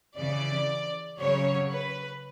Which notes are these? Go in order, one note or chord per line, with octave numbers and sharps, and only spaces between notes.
C#3 E3 D5
C#3 F#3 C#5
B4